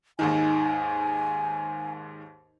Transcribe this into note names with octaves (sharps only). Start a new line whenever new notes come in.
D#2 G#2 D#3 D#4 G#5